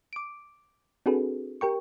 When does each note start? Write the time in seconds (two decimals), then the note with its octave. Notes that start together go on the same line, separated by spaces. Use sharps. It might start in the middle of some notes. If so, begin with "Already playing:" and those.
0.13 D6 D7
1.06 C4 D4 F#4 G#4 A4 B4
1.61 G4 A#4 G5 C#6